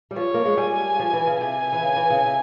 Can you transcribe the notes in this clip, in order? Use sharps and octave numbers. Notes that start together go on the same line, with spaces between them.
G3
F3 C#5
A#3
G#3
G3 G#5
F3
E3
C#3
C3 G#5
E3
C#3
E3
C#3
C3